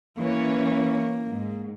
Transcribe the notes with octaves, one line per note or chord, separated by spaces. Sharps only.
E3 A#3 C#4 C#5
G#2